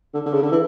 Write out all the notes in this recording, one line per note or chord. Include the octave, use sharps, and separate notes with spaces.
D3
D3
C#3
D3
E3